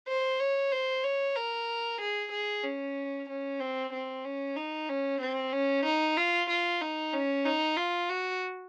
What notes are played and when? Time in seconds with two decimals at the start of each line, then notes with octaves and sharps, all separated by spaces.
0.08 C5
0.40 C#5
0.72 C5
1.04 C#5
1.36 A#4
2.01 G#4
2.32 G#4
2.64 C#4
3.29 C#4
3.61 C4
3.93 C4
4.24 C#4
4.56 D#4
4.89 C#4
5.21 C4
5.53 C#4
5.86 D#4
6.18 F4
6.50 F4
6.82 D#4
7.13 C#4
7.46 D#4
7.77 F4
8.10 F#4